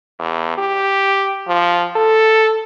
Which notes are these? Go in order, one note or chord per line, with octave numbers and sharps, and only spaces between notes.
E2
G4
F3
A4